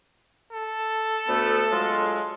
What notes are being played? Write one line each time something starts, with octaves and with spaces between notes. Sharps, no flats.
A4
D2 A3 B3
F#3 G#3 F4